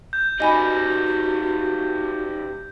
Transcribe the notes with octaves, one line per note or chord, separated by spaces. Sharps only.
G6
G3 D#4 F#4 D#5 G#5 B5